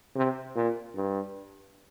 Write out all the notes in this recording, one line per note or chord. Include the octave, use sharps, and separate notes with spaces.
C3
A#2
G2